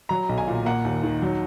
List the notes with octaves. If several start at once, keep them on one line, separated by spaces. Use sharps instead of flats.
F#3 A#5
B1
G#5
A#2
A#3 F#5
D#2
D#3
F#3